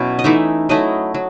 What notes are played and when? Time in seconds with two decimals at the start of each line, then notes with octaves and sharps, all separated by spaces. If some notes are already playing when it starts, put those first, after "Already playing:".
Already playing: B2 F#3 C#4 E4
0.19 D#5
0.24 E3 A3 D#4 E5
0.69 F#3 A3 E4 D#5
1.14 F#3